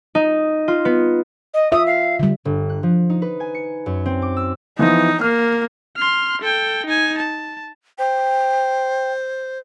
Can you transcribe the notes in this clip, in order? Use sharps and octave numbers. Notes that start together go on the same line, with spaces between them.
D#4
F4
B3
D#5
F4 E5 D#6
F5
D3 G3
G1
F#6
F3
D#4
B4
G#5
C#7
F#2
C4
D6
E6
E3 F3 B3 D#4
A#3 F6
C6 F6
A4 G5
D#4 G#5
A5
C5 G5